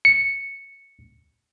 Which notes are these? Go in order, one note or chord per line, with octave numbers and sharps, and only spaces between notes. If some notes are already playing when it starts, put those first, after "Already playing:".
C#7